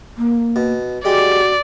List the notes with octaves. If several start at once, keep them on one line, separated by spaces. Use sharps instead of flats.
A#3
B2
G#3 F#4 G4 D5